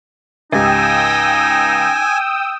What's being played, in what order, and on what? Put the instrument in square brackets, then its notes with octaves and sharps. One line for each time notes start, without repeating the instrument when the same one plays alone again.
[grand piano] C#2 G#2 G4 [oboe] D#4 [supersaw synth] G5 D#6 E6 [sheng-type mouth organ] G#5